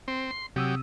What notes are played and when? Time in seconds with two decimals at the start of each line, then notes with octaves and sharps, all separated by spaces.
0.08 C4
0.31 C6
0.56 C3 F#3 G4 D#6 E6